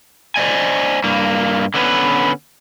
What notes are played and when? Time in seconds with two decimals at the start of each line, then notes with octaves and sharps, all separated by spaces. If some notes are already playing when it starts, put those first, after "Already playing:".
0.36 C5 D5 D#5 G#5
1.04 G2 A#3
1.74 D3 B3 C#4 B4